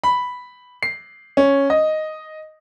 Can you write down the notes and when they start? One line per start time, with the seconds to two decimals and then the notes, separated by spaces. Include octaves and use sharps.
0.04 B5
0.83 C7
1.37 C#4
1.70 D#5